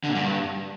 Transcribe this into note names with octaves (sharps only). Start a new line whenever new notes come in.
D3
A#2
G2